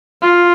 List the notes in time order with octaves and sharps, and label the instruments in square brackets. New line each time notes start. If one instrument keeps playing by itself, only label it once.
[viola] F4